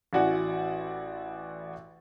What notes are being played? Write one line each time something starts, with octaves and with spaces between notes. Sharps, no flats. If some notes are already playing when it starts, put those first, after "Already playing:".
A1 E4 F#4 D5 F#5 G#5